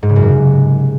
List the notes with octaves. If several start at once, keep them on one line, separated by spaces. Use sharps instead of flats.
G#2
C#3
F#2
C3